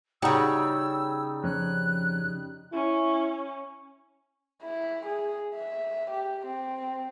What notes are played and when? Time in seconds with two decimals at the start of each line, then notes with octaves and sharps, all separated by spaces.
0.22 C#3 G3 D#4 F#4 E6
1.44 F2 C#4 F#6
2.73 C#4 E4
4.63 E4
5.06 G#4
5.56 E5
6.11 G4
6.47 C4